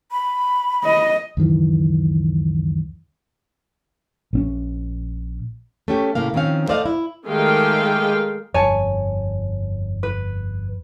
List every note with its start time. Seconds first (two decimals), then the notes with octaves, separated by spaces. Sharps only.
0.11 B5
0.84 D#5
1.37 C#2 F#2 D#3 E3
4.33 A#1 C4 C#4
5.88 A3 C#4 G4
6.15 A2 C#3 A#3 F5
6.34 D#3 F3 C4 C#4 F5
6.68 A3 C5 D5 D#5 F5
6.86 E4
7.26 D#3 G#3 A3 G4 F5 G5
8.54 G1 F2 C#5 G#5 A5
10.03 B4